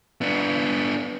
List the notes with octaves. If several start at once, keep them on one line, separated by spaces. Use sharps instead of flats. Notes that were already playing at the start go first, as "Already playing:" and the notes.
B3 D4